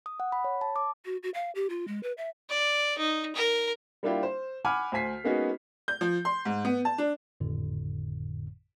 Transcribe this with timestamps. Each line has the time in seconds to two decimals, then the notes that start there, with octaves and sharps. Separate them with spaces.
0.06 D#6
0.20 F#5
0.32 B5
0.44 C#5
0.61 A5
0.76 D6
1.05 F#4
1.23 F#4
1.34 F5
1.55 G4
1.70 F4
1.88 G#3
2.03 B4
2.18 E5
2.49 D5
2.98 D#4
3.35 A#4
4.03 G3 A#3 D4 E4 F4 G4
4.23 C5
4.65 F#5 G#5 B5 D6 F6
4.92 D2 C5 G#5 B6 C7
5.24 G#3 A#3 B3 C#4 D#4 F#4
5.88 G6
6.01 F3
6.25 C6
6.45 G#2
6.65 B3
6.85 A5
6.98 D4
7.40 G#1 F2 A2 D3